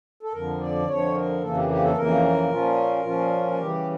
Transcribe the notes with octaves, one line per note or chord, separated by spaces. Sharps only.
A4
F2 D3 F3 A#4
D5
F2 D3 F3 C#5
A#4
F2 C#3 E3 A#3 A4
G4
G4
A4
F2 C#3 E3 A#3 A#4
A#2 F3 C#4 F4
A#2 F3 C#4 F4
F4
C#3 E3 G3 G4